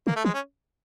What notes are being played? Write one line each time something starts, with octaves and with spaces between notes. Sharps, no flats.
D3 A#3
A3
E3 G#3
C#4